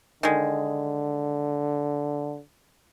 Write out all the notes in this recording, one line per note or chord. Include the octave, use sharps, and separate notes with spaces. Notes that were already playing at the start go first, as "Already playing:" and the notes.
D3 D#3 G#3